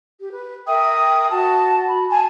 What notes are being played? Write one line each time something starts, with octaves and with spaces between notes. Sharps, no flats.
G4
B4
A#4 E5 G5 D#6
F#4 A5
F#4 B5
G#5 A5